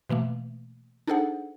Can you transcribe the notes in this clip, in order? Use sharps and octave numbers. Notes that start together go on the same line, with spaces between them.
B2 E3 A3 A#3
D4 D#4 G#4 A4 C5 F#5